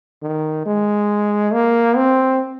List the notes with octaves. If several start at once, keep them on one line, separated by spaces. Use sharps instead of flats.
D#3
G#3
A#3
C4